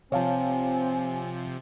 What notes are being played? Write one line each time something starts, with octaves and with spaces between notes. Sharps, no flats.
C3 F3 C4 C#5 F5 G#5 A5